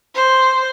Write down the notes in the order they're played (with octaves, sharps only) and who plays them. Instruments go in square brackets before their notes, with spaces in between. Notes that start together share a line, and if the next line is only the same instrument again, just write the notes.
[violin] C5